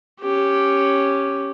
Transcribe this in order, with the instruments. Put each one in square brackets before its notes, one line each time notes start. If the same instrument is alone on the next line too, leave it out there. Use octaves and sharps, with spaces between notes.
[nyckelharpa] C#4 G4